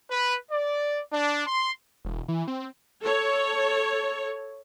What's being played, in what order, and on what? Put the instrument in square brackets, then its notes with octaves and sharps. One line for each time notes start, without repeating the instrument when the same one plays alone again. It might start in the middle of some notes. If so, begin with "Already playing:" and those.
[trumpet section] B4
D5
D4
C6
[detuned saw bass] E1
E3
C4
[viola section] A4 C#5